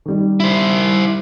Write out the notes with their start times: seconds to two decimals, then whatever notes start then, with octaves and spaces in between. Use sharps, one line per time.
0.06 D#3 G3
0.40 E4 C5